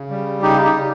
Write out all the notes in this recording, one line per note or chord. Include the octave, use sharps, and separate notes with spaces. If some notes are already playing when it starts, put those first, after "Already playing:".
Already playing: C#3
G3
C#3 D#4 G4
D#4 G4
C#3